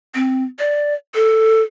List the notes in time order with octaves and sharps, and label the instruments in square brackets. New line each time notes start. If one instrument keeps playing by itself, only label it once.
[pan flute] C4
D5
A4